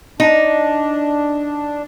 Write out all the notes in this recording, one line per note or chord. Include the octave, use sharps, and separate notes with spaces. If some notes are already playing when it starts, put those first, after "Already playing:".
D4 D#4